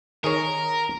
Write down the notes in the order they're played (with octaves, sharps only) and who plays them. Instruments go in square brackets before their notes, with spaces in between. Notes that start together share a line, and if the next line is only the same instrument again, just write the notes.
[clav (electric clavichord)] D#3 G#4 C#5 [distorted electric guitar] A#4